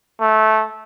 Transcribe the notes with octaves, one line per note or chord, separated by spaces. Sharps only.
A3